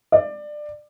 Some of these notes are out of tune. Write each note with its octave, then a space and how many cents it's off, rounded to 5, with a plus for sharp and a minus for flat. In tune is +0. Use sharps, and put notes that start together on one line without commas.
D5 +20